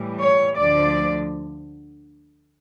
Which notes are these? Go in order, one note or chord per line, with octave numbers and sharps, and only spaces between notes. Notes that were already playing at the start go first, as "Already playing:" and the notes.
Already playing: A2 E3 G3
C#5
D2 D3 F3 D5